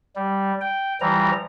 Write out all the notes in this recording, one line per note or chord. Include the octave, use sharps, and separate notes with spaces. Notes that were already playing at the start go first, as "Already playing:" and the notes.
G3
G5
E3 F3 G3 A#5